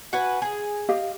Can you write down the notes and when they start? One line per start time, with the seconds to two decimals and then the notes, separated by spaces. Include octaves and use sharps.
0.13 F#4 B4 G#5
0.42 G#4
0.89 G4 D#5 F5